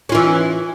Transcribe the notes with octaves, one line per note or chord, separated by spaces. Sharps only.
E3 C#4 F4